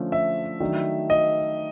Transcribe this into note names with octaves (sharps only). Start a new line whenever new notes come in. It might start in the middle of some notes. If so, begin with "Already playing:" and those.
Already playing: D3 F3 A3 C#4
E5
D#3 F#3 A3 D4
D#5